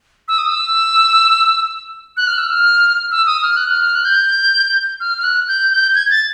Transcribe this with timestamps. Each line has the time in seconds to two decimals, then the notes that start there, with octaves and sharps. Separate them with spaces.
0.28 E6
0.38 D#6
0.47 E6
2.17 F#6
2.27 F6
2.38 E6
2.50 F6
3.11 E6
3.26 D#6
3.42 F6
3.57 F#6
3.70 F6
3.95 F#6
4.05 G6
5.00 F6
5.18 F6
5.24 F#6
5.48 G6
5.71 G6
5.95 G#6
6.11 A6